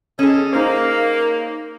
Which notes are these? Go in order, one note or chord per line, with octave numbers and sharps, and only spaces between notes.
C#4 G#4 A4 D#5
A#3 D#4 C5